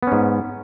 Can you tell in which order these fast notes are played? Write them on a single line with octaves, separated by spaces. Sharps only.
B3 C#4 G#2